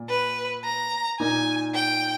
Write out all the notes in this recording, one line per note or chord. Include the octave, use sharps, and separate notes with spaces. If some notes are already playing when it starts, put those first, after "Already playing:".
Already playing: A#2
B4
A#5
A#2 A#3 D#4 G#5
G5